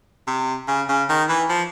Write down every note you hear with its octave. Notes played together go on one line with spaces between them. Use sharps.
C3
C#3
C#3
D#3
E3
F3